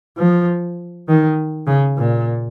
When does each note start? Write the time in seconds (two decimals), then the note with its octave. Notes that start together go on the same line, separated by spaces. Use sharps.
0.18 F3
1.08 D#3
1.67 C#3
1.97 A#2